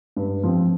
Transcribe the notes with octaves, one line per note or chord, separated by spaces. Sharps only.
G2
F3 C4